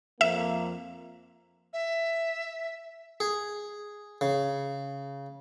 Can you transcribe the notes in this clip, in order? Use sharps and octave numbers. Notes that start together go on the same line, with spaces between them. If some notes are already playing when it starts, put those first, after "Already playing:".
F2 A#3 E5
E5
G#4
C#3